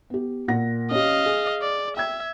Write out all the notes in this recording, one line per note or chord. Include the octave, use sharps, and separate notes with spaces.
B3 G4
A#2 F#5 A#6
C#4 G4 D#5 F5
G#4
D5
E5 G5 G#6